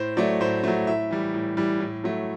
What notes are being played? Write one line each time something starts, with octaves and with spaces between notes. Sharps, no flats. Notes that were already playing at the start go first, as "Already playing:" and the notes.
Already playing: A2 C5
F#3 A3 D5
A2 C5
F#3 A3
A2 E5
E3 G3
A2
E3 G3
A2
F#3 A3